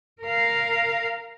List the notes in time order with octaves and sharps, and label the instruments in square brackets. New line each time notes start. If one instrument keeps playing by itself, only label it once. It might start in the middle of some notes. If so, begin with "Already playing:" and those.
[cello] A#4 F5